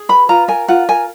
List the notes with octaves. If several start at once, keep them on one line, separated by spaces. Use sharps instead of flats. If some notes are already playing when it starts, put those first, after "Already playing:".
Already playing: G#4
B4 B5
F4 A#5
A#4 G#5
F4 F#5
A#4 G#5